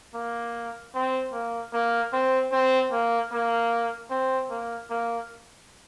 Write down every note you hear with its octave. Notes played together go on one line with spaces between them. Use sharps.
A#3
C4
A#3
A#3
C4
C4
A#3
A#3
C4
A#3
A#3